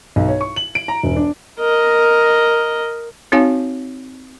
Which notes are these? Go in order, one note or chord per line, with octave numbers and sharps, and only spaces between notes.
B1
C#5
C#6
F#7
D7
A#5
E1
D4
A#4 D#5
C4 D#4 F#4 C#5 F5 G#5